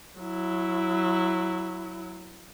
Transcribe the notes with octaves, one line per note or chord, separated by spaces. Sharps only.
F#3 E4